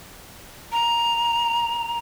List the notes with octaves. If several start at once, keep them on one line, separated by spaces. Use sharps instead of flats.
A#5